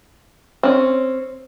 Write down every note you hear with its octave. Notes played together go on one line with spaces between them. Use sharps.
C4 C#4